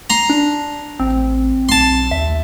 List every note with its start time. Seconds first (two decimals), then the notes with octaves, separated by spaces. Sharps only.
0.10 A#5 C6
0.30 D4
1.00 A1 C4
1.69 B1 A5 C6
2.11 D#2 E5